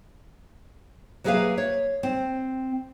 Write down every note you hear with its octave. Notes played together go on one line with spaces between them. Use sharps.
F#3 A#3 G#4 B4 E5 F5
C#5
C4